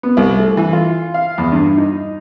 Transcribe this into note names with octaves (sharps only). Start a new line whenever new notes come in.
B3
C2
A3
E3
F4
F5
E2
G2
D#4